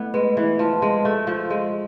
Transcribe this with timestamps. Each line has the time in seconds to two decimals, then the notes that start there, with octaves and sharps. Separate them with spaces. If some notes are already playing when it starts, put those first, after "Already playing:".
Already playing: A3 B3 E4
0.14 G#3 B4
0.37 E3
0.59 F3 A5
0.82 G#3
1.04 A3 F5
1.27 F3
1.50 G#3 F4